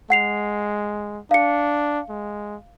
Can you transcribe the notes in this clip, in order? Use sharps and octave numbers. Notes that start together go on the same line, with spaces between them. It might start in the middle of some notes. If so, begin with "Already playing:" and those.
G#3 F#5 C7 F7
D4 F5 C#7
G#3